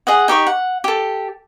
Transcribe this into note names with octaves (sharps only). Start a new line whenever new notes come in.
G#4 D#5 F#5
D#4 G4 D#5 C#6
F#5
G4 A4